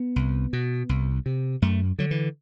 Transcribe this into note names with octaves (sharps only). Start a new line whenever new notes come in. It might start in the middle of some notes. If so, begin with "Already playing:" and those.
Already playing: B3
C2
B2
C2
C3
F#2 A3
D3 F#3
E3